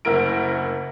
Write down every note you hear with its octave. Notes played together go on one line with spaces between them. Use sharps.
F#1 D2 E4 A#4 D7